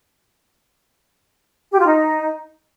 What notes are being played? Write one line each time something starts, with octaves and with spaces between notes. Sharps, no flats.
G4
F4
D#4